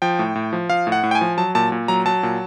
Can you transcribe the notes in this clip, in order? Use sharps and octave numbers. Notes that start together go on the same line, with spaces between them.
F3 G5
A2
A2
F3
F3 F5
A2
F#5
A2
G5
G#5
F3
F#3 A5
A#2 A5
A#2
F#3 A#5
F#3 A5
A#2